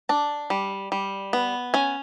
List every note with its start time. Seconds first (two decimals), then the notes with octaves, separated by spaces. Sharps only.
0.09 D4 A5
0.50 G3
0.92 G3
1.33 B3
1.74 C#4 G#5